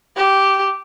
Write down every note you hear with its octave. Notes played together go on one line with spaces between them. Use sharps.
G4